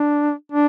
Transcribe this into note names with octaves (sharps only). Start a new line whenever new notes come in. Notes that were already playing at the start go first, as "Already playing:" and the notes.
Already playing: D4
D4